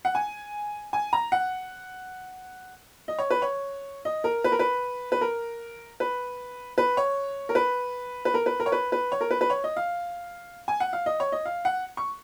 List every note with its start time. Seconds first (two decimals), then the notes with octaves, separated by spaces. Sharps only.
0.05 F#5
0.15 G#5
0.93 G#5
1.13 A#5
1.32 F#5
3.08 D#5
3.19 C#5
3.31 B4
3.42 C#5
4.05 D#5
4.24 A#4
4.44 B4
4.52 A#4
4.59 B4
5.12 B4
5.21 A#4
6.00 B4
6.78 B4
6.97 C#5
7.49 A#4
7.55 B4
8.25 B4
8.34 A#4
8.46 B4
8.60 A#4
8.66 C#5
8.72 B4
8.92 B4
9.12 C#5
9.21 A#4
9.31 B4
9.41 B4
9.50 C#5
9.64 D#5
9.76 F5
10.68 G#5
10.80 F#5
10.93 F5
11.06 D#5
11.20 C#5
11.32 D#5
11.46 F5
11.65 F#5
11.97 C#6